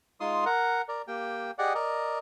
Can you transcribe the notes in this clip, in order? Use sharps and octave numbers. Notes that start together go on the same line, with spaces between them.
G#3 D#4 F4 C6 D#6
A#4 F#5
A#4 D5
A#3 G4 G5
G4 G#4 D5 D#5 F#5
A#4 D5 D#5